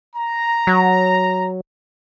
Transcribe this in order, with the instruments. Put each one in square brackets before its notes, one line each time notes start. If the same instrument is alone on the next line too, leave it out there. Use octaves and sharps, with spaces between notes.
[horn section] A#5
[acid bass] F#3